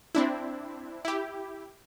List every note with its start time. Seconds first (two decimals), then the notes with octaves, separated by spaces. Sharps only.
0.15 C4 D4 E4
1.05 E4 G4